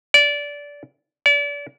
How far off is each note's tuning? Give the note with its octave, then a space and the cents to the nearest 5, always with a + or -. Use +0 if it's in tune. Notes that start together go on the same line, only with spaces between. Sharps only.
D5 -20
D5 -35